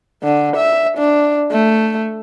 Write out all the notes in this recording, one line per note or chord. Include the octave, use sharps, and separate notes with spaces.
D3
E5
D4
A3